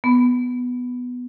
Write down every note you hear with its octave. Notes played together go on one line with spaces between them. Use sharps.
B3